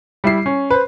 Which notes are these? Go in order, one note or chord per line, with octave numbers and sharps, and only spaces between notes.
G3 E4 C7
C#4
B4 C5